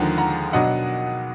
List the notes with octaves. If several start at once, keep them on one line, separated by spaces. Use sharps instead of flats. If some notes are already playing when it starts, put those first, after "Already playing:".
Already playing: D#2 D3 F3 G#3 F#5 A#5
F#5 A#5
B2 F#3 D4 D#5 F#5